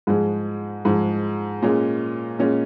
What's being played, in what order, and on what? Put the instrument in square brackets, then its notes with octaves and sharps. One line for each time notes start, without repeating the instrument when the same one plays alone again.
[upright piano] G#2 F3 G#3
G#2 F3 G#3
A#2 G#3 C#4
A#2 G#3 C#4